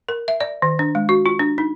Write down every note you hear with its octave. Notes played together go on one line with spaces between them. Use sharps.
A#4
E5
D5
D#3
D4
G#3
F#4
F4
D4
D#4